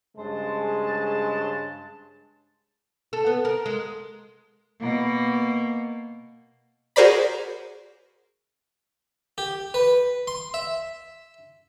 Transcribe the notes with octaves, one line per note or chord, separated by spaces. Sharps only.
G2 C#3 G#3 C5 A5
A4
B3
A#4
G#3
B2 A#3
F#4 G#4 A#4 C5 D5 B5
G4
B4
C6
E5